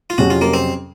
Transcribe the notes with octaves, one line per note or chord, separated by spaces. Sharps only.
F4
F2 C3 F#3 C#4 F#4 G#4
F4
A#3
C4